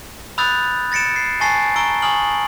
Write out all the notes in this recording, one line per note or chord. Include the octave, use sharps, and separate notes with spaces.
B5 D#6 E6 F#6 G6 A6
A6 A#6 C#7 D7 E7
C7
G#5 A5 C#6 A6 A#6 C7
A#5 C#6 E6 D7 G7
G#5 C#6 D#6 F6 F#7